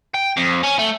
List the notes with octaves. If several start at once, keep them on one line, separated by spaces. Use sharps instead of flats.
G5
F2
C#4
A3